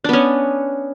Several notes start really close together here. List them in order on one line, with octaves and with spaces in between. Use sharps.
D4 B3 C#4